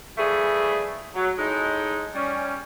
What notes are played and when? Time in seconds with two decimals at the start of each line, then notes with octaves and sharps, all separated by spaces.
0.17 E3 F3 G3 A3 G#4
1.15 F#3
1.38 A2 G#3 D#4
2.14 G3 C#4